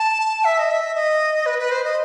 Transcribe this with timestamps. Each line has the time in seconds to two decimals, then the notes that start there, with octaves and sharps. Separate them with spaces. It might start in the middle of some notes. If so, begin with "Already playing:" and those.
Already playing: A5
0.44 E5
0.59 D#5
0.70 E5
0.95 D#5
1.46 B4
1.59 B4
1.71 C5
1.84 D#5